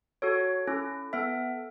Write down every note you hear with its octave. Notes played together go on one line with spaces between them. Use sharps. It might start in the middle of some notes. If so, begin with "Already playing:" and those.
F#4 A4 C#5
C#4 E4 A4
B3 A4 E5